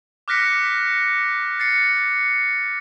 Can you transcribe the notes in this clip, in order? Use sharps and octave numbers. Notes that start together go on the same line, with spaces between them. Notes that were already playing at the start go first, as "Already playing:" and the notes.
D6 F6 F#6 A#6 B6 C#7
A6 C7 C#7